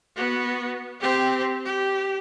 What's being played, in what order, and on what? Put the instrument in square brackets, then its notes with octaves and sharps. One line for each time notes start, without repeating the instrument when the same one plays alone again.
[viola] B3 F#4
C4 G4
G4